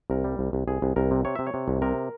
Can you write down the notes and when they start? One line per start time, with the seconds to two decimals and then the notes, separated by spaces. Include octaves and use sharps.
0.10 C2 A#4
0.24 G3
0.39 C2
0.53 C2
0.68 C2 G#4
0.82 C2
0.96 C2 A#4
1.11 C3
1.25 C3 C#5
1.35 C3 E5
1.47 C#5
1.54 C3
1.68 C2
1.82 C3 A#4